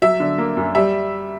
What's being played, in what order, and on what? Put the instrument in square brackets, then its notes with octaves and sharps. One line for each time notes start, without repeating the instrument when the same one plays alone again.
[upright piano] F#3 E5
D3
A#3
F#2
G3 E5